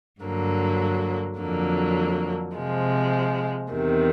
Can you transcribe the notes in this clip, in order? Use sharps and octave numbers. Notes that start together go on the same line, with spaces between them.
G2 D3 F#3 A#3
F2 D3 F#3 A#3
C3 F3 G#3
E2 C3 D#3